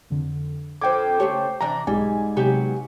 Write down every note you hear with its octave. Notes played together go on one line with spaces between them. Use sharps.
F2 D3
F2 D3 C5 G5 D6 G#6
C#3 A3 G4 C#5
C3 E3 D4 A#5
B1 G#2 G3 G#5
C3 F#3 B3 G4